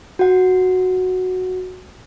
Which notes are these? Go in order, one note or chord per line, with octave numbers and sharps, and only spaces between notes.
F#4 F#5